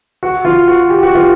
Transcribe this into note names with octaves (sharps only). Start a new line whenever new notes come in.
F#4
F4
F#4
G4
F#4
F4 G4